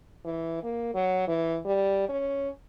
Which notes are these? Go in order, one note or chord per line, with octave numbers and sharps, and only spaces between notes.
E3
A#3
F#3
E3
G3
C#4